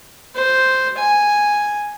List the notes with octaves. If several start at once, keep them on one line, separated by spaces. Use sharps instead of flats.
C5
G#5